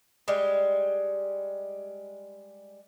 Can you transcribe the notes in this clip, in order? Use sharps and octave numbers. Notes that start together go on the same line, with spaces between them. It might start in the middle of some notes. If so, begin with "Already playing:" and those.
G3 G#3